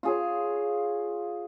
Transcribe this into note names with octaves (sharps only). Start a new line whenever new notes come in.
F4 G#4 C#5